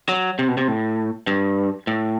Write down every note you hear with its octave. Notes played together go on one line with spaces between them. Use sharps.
F#3
C3
B2
C3
A2
G2
A2